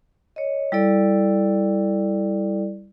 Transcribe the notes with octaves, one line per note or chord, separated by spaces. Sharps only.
C#5 D#5
G3 E4 A4 D5